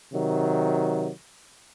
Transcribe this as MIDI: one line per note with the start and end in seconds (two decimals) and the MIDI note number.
0.13 1.10 48
0.13 1.10 51
0.13 1.10 54